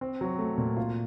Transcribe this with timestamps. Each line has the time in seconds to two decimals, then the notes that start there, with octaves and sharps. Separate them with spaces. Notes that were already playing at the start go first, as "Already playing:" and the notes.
0.01 C4
0.21 F#3
0.39 A3
0.58 A#2
0.77 F4